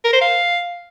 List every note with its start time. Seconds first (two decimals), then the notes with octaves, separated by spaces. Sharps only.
0.05 A#4
0.13 C5
0.21 F5